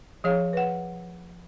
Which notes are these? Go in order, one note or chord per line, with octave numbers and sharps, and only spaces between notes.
F3 G#4 C#5 F5
B4 F#5